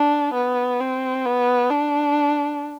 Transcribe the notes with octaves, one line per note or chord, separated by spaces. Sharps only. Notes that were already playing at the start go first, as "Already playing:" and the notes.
Already playing: D4
B3
C4
B3
D4